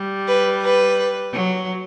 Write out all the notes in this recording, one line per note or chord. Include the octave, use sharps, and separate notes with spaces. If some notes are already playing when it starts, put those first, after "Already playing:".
Already playing: G3
B4
B4
F#3